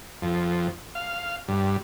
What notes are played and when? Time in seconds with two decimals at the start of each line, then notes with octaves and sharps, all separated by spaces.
0.22 F2
0.95 F5
1.48 G2